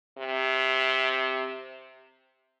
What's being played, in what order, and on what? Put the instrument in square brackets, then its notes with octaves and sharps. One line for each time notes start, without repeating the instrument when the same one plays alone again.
[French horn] C3